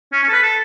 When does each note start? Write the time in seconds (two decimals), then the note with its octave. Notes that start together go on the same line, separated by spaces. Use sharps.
0.12 C#4
0.23 C#4
0.28 A4
0.33 B4
0.43 A4